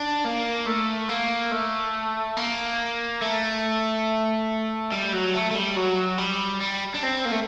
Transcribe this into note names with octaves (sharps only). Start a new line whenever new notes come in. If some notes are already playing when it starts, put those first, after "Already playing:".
Already playing: D4
A#3
A3
A#3
A3
A#3
A3
G3
F#3
A3
A3
G3
F#3
G3
G3
D4
C4
A#3
A3